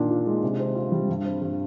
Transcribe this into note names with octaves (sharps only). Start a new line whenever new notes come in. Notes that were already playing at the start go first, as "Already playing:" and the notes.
Already playing: A#2 D#3 D4
F4
G#3
C3
C4
F4
G3
G2
C4
G2